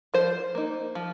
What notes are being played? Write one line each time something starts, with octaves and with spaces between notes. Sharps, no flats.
F3 C5
A#3 D#4
F3